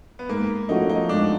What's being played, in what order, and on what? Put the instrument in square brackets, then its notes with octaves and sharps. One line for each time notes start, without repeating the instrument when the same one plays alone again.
[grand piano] B3
[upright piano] G#2 [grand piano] A#3
[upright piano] F3 A3 C#4 F#4 [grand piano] D#4
[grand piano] D#4
[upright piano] G#2 [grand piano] D4